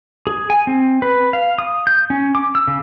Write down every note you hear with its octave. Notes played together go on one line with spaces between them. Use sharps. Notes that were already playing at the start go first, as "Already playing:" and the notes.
G#4
G#5
C4
B4
F5
D#6
G6
C#4
D6
E6
C#3